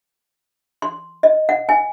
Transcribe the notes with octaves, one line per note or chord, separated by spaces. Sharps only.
C6
D#5
F#5
G#5